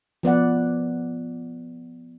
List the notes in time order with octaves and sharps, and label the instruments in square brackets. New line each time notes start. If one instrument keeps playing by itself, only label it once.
[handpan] F3 B3 D5 F#5